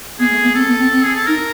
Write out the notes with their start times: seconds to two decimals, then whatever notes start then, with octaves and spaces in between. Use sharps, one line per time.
0.18 B3 G#4
0.31 A3
0.42 B3
0.54 C4 A4
0.67 B3
0.78 C4
0.91 C4
1.04 G#4
1.15 A4
1.26 D#4 A#4